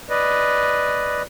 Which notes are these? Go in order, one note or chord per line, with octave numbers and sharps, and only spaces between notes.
B4 D5 D#5